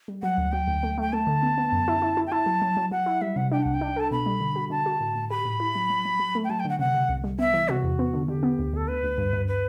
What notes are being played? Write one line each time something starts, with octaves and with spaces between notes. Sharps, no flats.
G3
F#3 F#5
D2
F#3 G5
D2
A3
A3 G5
A3 A5
D3
B3
B3
F#2
E4
E4
E4
G5
E4 A5
F#3
F#3
F#3
F#3 F#5
E4
G3 E5
C3 F#5
D4 G5
C2 F#5
G5
D4
A4 A5
B2 B5
G3
D3
F#4
D3 A5
F#4
A2
A2
G4 B5
A2
E4
F#3
F#3
F#3
F#3
A3
G5
F#3 A5
G5
D3 F#5
C3 F#5
C3
C2
G3
B3 E5
E3
C3 F#4
E2
B3
D3
D3 G4
B3
D2
D2 A4
D2 B4
D2
G2
G2
B4